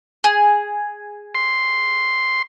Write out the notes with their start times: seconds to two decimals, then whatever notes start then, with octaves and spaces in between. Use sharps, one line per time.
0.24 G#4
1.35 C6